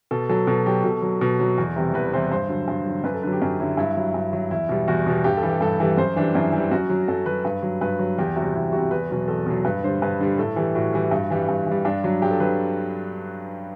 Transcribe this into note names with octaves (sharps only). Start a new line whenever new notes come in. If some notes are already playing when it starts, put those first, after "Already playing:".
B2 A4
F#3 A4
B2 A4
F#3 G4
B2 A4
F#3
B2
F#3
E2
C3 E3 G3
E2 B4
C3 E3 G3 C5
G2 C5
D3 F#3
G2
D3 F#3
F#2 B4
A4
D3 F#3 B4
G4
F#2
D3 F#3 E4
G2 E4
F#3
G2
F#3
E2 E4
B2 G3
E2 F#4
B2 G3
G2 G4
A4
E3 G3
G4
G2 A4
E3 G3 A4
F#2 C5
E3 G3 D4
F#2 E4
E3 G3
F#2 F#4
F#3
F#2 A4
F#3 B4
G2 B4
F#3
G2 B4
F#3
E2 G4
C3 F#4
G3
E2 E4
C3 G3 F#4
E2 B4
B2 F#3
E2 A4
B2 F#3
G2 B4
D3 G3 C5
G2 B4
D3 G3
A2 A4
E3 G3
A2 F#4
E3 G3
G2
E3 G3
G2
E3
G3
G2 D4
F#3
G2 G4
A4
F#3 B4